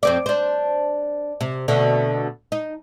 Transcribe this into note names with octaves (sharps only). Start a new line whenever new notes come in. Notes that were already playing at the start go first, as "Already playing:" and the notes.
F2 C4 D5
D4 C5
C3
B2 D3 A3
D#4